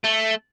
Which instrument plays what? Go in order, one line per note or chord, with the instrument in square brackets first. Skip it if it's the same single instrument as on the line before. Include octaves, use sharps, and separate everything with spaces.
[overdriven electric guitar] A3